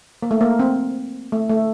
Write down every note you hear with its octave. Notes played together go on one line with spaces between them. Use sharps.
A#3
A3
A#3
C4
A3
A3